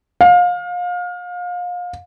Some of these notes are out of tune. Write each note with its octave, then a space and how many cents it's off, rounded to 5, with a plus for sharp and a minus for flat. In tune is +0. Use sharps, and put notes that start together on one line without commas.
F5 +30